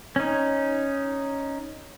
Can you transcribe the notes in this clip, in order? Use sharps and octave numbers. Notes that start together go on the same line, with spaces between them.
C#4 D#4